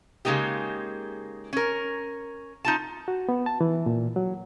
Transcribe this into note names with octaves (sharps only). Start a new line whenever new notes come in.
C#3 G#3 A#3 D#4 G4
C#4 A#4
D#4 F4 A5
F#4
B3
A5
E3
A#2
F#3